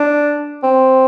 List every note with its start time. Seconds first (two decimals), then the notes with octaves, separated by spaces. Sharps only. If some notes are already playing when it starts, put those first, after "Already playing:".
Already playing: D4
0.63 C4